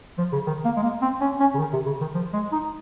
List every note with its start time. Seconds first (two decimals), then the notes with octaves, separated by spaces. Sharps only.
0.18 F3
0.32 C#3
0.47 D#3
0.65 A#3
0.76 G#3
0.83 A#3
1.02 C4
1.21 C#4
1.40 C#4
1.54 C#3
1.59 D#3
1.73 C3
1.86 C#3
2.01 D#3
2.15 F3
2.33 G#3
2.52 D#4